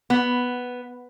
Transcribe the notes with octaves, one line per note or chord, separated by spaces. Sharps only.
B3